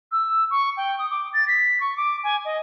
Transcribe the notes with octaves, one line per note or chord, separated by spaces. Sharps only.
E6
C#6
G5
D#6
D6
A6
B6
C#6
D6
G#5
D#5